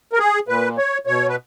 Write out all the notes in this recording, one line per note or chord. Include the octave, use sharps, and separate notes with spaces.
A#4
G#4
A#2 B4
C#5
B2 C#5
B4